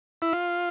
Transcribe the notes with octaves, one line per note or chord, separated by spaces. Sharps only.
E4
F4